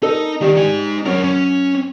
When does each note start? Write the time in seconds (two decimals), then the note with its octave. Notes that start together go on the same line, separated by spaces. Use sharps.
0.02 D#4 A4 A#4 D#5
0.41 D#3 G3 G4
0.56 D#4 G#5
1.06 F#2 A#4 C#5
1.24 C#4